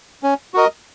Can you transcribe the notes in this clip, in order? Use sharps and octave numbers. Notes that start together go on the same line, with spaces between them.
C#4
F#4 A#4 D#5